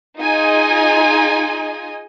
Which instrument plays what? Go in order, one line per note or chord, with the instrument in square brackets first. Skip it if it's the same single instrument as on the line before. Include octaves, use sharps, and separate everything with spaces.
[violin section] D#4 F4 G#4 D#5 G#5